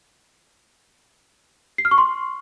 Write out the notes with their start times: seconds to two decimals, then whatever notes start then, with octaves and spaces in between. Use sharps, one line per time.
1.78 C7
1.85 F6
1.91 C#6
1.98 C6